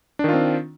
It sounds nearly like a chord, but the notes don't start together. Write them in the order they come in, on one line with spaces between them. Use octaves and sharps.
D4 D#3 F4 C4